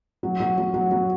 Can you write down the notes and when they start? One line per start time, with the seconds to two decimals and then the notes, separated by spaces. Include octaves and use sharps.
0.23 F#3
0.40 F#3
0.58 F#3
0.74 F#3
0.91 F#3